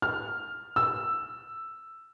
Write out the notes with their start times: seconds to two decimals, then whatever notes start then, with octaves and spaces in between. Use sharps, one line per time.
0.02 F6
0.76 E6